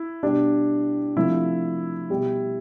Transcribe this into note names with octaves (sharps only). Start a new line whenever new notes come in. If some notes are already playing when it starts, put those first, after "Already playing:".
Already playing: E4
B2 G3 D4
C3 F3 A3 E4
B2 G3